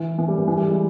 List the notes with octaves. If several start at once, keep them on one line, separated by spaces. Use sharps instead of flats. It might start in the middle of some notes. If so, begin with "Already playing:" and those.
Already playing: E3
E3
G3
E3
E3
G3
G#3